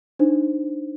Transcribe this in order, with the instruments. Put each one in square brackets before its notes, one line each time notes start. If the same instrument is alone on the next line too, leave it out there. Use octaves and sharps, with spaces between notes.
[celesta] D4 D#4 C5